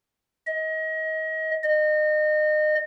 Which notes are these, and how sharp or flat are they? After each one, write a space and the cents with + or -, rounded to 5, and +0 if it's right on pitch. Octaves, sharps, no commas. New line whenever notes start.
D#5 +30
D#5 -30